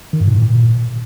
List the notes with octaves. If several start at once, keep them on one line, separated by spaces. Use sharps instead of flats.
D#3
G2
A#2
A2
A#2